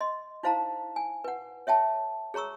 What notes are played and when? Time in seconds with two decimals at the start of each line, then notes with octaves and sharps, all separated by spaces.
0.01 D#5 C6
0.43 D#4 E4 C5 F5 A5 A#5
0.96 G#5
1.24 B4 F#5
1.67 C#5 E5 G5 A5
2.34 G#4 C#5 A#5 C#6 E6